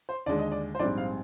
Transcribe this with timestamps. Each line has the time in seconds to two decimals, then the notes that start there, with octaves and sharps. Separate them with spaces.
0.09 C5
0.26 D#2 D3 G#3 D4 D5
0.39 D#5
0.52 D5
0.75 C5
0.79 A#1 G#2 G3 C4 D5
0.98 F5